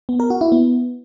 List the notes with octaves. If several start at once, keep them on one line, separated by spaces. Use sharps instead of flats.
B3
A#4
F#4
E4
B3